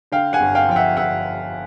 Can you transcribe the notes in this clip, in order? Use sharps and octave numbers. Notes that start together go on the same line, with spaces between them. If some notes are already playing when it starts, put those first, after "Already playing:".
D3 F5 G5
F#5 G#5
G1
F5 G5
F3 G5
E5 F#5
G1 E5 F#5